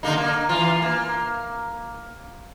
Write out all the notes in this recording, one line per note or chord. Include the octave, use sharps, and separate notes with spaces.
D3 A#3 D#4
A#3
E3 F4
A#3